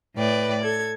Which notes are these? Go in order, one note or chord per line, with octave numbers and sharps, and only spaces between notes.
A2 B4 D5 G5
A4 G#6